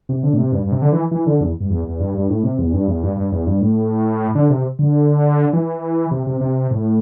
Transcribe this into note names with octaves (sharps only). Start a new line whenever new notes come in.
C3
D3
A2
C3
G2
G2
C3
D3
E3
E3
D3
E2
G2
E2
E2
G2
G2
A2
C3
E2
G2
E2
G2
G2
E2
G2
A2
D3
C3
D3
E3
C3
C3
C3
A2